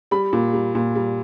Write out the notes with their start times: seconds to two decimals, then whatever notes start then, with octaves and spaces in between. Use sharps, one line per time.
0.11 G3 B5
0.33 A#2
0.53 G3
0.75 A#2
0.95 G3